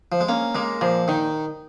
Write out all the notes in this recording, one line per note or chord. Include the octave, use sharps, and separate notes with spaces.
F3
G#3
A#3 C#4
G#3 A#3
A#2 F3
D#3 D#4